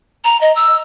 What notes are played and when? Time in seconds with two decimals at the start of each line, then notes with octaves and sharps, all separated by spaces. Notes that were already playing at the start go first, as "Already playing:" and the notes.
0.24 A#5
0.41 D#5
0.56 E6